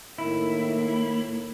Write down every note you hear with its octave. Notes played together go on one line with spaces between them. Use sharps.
A2 D#3 A#3 E4